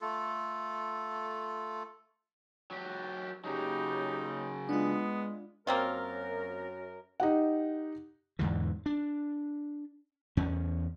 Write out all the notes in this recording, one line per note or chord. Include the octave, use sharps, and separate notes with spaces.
A3 F4 A4
F#3 G4
C#3 F#3 D#4 G4
G#3 B3 D4 F4
F#2 A#3 C4 F4 A#4
D#4 G4 F#5
E2 G#2 D3 E3
D4
E2 C#4